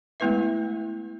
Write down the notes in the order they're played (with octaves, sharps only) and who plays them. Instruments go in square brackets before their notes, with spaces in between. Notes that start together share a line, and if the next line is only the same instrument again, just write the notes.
[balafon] G#3 A3 B3 E4 B4 E5